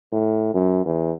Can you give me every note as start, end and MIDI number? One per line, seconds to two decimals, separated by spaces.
0.13 0.52 45
0.54 0.83 42
0.86 1.12 40